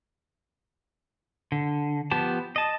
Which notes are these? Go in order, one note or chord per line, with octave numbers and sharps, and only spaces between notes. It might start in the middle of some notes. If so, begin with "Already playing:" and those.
D3
F3 B3 G4 A5
D#5 A5